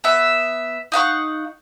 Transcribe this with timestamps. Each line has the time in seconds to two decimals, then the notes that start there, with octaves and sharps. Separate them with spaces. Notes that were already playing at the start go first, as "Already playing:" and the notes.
0.04 B3 E5
0.92 D#4 F5 F#5 C#6